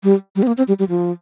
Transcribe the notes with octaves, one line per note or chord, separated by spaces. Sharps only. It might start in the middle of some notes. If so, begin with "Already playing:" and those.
G3
G3
C4
A#3
C4
G3
G3
F3